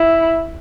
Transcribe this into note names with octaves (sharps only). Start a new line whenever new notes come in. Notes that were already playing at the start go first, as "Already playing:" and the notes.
Already playing: E4